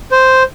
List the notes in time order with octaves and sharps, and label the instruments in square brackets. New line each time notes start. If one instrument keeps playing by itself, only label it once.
[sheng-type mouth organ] C5